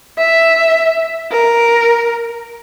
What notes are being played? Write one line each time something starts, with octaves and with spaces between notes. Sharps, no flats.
E5
A#4